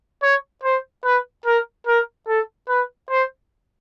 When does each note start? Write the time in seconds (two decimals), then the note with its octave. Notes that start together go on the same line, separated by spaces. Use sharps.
0.22 C#5
0.63 C5
1.04 B4
1.45 A#4
1.87 A#4
2.28 A4
2.69 B4
3.10 C5